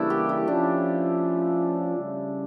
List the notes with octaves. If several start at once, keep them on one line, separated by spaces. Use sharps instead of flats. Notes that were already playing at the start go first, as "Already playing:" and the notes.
Already playing: C#3 E3 G3 A3 A#3 D4 E4
G4
E4
F3 C#4 D4 F4
C#3 G3 C#4